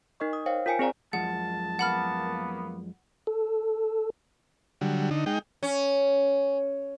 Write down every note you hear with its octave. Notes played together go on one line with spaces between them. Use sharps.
D#4 A#4 D#5 C#6
D#6
C5 C#5 F5 G5
F4 A#4 G5 G#5 C#7 D7
C4 G#4 C5 D5 G#5 A#5
F#2 F3 G#3 F#5 A5
A#3 B3 F#5 B5 F6
A4
D3 F#3 G3
D3 D#4
G#3 D#4 G5
C#4